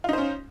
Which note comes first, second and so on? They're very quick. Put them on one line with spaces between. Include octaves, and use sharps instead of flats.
F4 D#4 C5 C#4